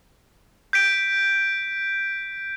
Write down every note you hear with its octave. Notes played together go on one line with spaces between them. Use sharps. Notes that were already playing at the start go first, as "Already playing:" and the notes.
G6 B6 D7